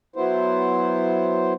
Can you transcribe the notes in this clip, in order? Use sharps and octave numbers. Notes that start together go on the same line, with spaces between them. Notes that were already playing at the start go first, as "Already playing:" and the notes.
F#3 B3 E4 C5